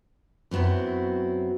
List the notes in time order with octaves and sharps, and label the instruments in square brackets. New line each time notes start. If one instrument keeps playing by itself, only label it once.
[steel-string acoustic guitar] F#2 F#3 B3 C4 E4